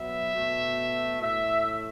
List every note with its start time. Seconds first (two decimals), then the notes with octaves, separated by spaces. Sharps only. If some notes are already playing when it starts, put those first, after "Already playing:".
Already playing: B2 F#3 B3 E5
0.33 B2 A3
1.21 A2 A3 E5